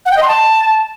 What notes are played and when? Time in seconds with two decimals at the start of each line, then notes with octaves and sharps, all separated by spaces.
0.06 F#5
0.11 G5
0.17 D#5
0.22 C6
0.28 A5